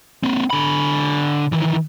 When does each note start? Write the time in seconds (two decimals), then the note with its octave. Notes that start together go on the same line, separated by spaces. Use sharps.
0.23 A#3 C4
0.50 D3 B5
1.52 D#3 E3